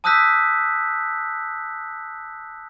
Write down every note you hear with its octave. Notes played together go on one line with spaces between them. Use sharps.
A5 D#6 E6 F#6 G6 B6